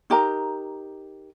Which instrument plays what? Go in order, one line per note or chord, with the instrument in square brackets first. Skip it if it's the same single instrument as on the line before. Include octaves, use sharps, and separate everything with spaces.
[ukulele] D#4 G4 A#4 A#5